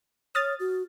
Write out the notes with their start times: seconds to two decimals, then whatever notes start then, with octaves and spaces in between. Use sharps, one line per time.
0.35 C#5 D#6 F6 A6
0.60 F#4